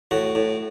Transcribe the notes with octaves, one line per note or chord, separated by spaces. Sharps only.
A2 F#4
A2